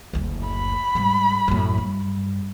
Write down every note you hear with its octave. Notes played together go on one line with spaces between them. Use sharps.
F#1 D2
B5
G#2 G3
F#2 A2
G2